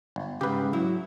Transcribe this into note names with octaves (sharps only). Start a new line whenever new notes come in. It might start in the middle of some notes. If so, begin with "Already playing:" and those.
G1
G#2 C#3 G4 B4
F#3 E4